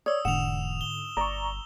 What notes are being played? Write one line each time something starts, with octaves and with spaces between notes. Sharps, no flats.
C#5 D5 D#6 E6
E1 G#2 D3 F#5 E7 F7
G7
G1 D5 A#5 C#6